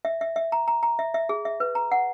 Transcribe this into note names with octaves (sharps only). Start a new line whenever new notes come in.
E5
E5
E5
A#5
A#5
A#5
E5
E5
G#4
E5
B4
A#5
F#5